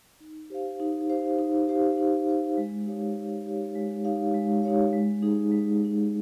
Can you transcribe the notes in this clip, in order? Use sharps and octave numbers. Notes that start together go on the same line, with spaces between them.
D#4
G4 C5 F5
D#4
G4 C5 F5
D#4
G4 C5 F5
D#4
G4 C5 F5
G#3
D#4 G4 C#5 F5
G#3
D#4 G4 C#5 F5
G#3
D#4 G4 C#5 F5
G#3
D#4 G4 C#5 F5
G#3
D#4 G#4
G#3
D#4 G#4